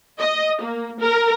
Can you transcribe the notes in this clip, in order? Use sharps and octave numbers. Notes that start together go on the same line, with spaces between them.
D#5
A#3
A#4